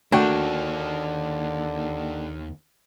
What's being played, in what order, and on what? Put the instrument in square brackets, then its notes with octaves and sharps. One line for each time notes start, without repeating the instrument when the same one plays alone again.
[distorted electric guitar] D#2 A#3 [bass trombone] D3 [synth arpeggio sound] A3 G5 [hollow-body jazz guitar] D4 F#4